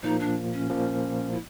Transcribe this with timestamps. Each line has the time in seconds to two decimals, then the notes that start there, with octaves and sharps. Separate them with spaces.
0.03 A#2 F3 A#3 D#4
0.20 D4
0.53 C#4
0.70 A#2 F3 A#3
1.32 E4